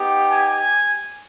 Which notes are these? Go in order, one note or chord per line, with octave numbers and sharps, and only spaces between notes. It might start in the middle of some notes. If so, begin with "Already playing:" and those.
Already playing: B3 D#4 G4
G#5